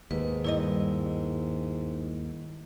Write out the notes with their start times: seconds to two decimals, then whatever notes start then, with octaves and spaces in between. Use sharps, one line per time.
0.11 D#2 G#2 B4
0.44 G2 E4 C#5 D#5